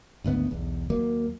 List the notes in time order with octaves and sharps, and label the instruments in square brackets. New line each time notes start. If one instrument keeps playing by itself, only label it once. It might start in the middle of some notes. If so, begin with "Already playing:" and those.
[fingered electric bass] G#1 D2 C#3 B3
B1 E2
D#2 F#3 A#3